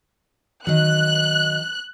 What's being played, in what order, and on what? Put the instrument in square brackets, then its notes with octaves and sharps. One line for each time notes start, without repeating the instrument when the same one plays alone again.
[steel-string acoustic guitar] D#3 F#3 [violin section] F#6